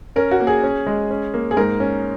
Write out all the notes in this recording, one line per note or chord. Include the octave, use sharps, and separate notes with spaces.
C#4 A#4
F#4
A#3
G#4
C#4
G#3
C#4
A#3
G#4
G#2 A#4
C#4